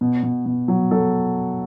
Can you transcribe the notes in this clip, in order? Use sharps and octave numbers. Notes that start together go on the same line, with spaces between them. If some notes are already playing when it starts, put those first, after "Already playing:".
B2
B2
B2
F#3
F#3 A4